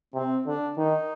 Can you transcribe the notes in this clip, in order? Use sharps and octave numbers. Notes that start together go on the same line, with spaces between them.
C3 C4
D3 D4
D#3 D#4